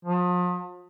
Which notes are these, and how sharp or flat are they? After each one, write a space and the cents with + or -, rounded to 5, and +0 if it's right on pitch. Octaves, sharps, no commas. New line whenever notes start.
F3 +40